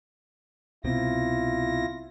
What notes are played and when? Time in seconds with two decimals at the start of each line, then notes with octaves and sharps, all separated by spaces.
0.84 C2 B2 C4 E4 F4 A#6